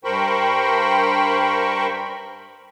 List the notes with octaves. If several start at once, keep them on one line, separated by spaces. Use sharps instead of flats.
G2 A#4 C5 G5 B5 C#6